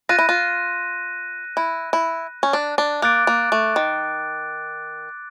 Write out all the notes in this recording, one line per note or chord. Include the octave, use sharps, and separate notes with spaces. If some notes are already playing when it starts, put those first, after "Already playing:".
F4 F#6 A#6 D#7
E4
F4
E4
E4
C#4
D4
D4
A#3 D6 F#6 A6 D7
A#3
A3
D#3